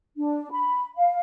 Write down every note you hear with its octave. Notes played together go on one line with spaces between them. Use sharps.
D4
B5
F5